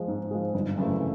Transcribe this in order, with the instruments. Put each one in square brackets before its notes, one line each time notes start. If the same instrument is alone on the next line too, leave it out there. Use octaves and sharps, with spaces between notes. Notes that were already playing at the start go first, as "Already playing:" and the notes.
Already playing: [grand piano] F3 G#3
G#2
F3 G#3
G1
F#2 C#3 E3 A3